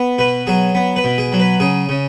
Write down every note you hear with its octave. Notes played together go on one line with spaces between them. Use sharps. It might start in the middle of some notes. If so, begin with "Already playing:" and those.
Already playing: B3
B2 B4
F#3 G#4
B3
B4
B2
G#4
F#3
B4
C#3 G#4
C#3